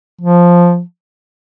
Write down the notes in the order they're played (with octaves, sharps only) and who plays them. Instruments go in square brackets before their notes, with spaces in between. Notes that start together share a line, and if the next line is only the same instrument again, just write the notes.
[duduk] F3